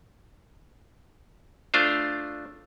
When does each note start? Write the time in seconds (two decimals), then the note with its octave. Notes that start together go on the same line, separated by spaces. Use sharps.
1.74 A3 D4 F4 C5